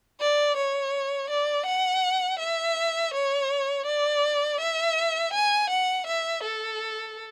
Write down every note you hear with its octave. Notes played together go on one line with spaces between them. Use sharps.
D5
C#5
D5
F#5
E5
C#5
D5
E5
G#5
F#5
E5
A4